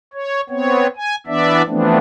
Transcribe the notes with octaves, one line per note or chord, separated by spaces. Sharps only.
C#5
B3 C4 C#5
G#5
E3 B3 D4 D5 E5
E3 F3 A3 B3 C4 D4